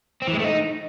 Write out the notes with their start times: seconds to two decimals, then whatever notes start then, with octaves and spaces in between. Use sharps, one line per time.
0.22 C4
0.28 E3
0.33 G#3
0.39 A3
0.45 D#4